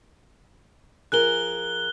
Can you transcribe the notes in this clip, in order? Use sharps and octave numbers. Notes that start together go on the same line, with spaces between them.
F3 G#4 A#4 F#6 G7